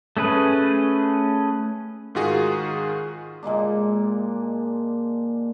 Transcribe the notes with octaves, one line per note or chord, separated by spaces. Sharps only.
A3 C#4 G#4 B4
G#2 D#3 F4 F#4 G#4
A#2 G#3 A#3 D4